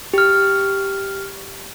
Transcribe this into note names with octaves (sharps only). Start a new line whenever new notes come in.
G4 F6